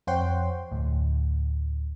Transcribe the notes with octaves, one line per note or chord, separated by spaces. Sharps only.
F2 C5 C#5 F#5 G5 C6
D2 A2